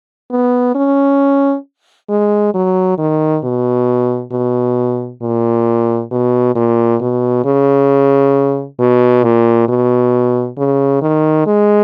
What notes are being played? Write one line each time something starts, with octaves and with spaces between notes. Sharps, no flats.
B3
C#4
G#3
F#3
D#3
B2
B2
A#2
B2
A#2
B2
C#3
B2
A#2
B2
C#3
D#3
G#3